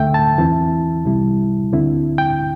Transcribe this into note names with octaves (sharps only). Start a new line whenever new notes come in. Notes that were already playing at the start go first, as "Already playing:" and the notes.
Already playing: D2 D3 A3 E5 G5
A5
E2 E3 C4 E4
C2 C3 G3 E4
D2 D3 C4 E4
G5